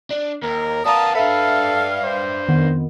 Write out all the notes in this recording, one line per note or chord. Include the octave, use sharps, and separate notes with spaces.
D4
D#2 A#4
B3 A#4 D5 F5 A5 A#5 D#6
D4 A4 B4 E5 F5
C5
F2 D#3 B3